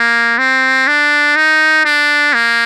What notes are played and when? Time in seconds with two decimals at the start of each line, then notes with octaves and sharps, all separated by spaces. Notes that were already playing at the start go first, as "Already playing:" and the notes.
Already playing: A#3
0.38 C4
0.87 D4
1.36 D#4
1.85 D4
2.34 A#3